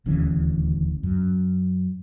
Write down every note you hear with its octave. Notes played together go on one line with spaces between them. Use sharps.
D#1 D2 C#3 E3
F#2